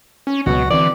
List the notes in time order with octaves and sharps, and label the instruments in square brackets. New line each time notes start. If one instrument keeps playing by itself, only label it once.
[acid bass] C#4
[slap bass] C#2 F#3 [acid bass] B2 [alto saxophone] F#4
[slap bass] D3 C4 [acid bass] E3 [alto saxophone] D5